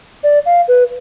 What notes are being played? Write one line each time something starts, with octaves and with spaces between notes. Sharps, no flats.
D5
F5
B4